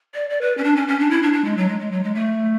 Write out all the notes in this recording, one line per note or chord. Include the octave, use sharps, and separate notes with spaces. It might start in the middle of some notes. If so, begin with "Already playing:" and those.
D5
D5
B4
C#4
D4
C#4
C#4
D4
E4
D4
D4
G#3
F#3
G#3
G#3
F#3
G#3
A3